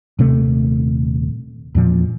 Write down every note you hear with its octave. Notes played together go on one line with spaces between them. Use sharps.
D#1 C3 A3
E2 A#2 F3